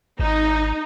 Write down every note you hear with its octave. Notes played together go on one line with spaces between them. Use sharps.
G#1 D#4